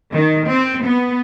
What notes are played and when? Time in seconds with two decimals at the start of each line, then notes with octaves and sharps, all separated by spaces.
0.13 D#3
0.49 C4
0.85 B3